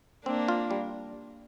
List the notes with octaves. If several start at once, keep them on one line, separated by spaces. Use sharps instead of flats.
A#3 C4 D4
F4
G3